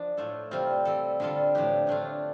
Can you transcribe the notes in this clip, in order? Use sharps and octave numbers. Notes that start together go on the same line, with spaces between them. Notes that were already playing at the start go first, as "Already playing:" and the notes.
Already playing: F3 D4
A2 A3 F4 A4
C3 G3 C4 F4
G3 C4 A4
D3 G3 F4 A4
A2 F3 D4 G4
A2 A3 D4 F4